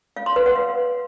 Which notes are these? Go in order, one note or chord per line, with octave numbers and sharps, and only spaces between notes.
F5
C6
B4
F#5
F5